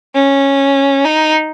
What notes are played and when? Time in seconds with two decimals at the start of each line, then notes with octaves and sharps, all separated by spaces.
0.15 C#4
1.05 D#4